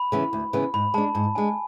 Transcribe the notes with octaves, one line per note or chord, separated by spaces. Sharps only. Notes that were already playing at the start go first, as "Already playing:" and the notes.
Already playing: B5
C#3 E3 B3
D2
C#3 E3 B3
G#2 B5
G#3 D4 A5
G#2 A5
G#3 D4 G#5